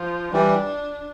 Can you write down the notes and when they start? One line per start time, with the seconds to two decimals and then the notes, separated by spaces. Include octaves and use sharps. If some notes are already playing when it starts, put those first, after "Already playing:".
Already playing: F3
0.33 E3 G3 D4